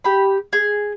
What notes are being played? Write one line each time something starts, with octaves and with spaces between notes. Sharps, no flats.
G4 B5
G#4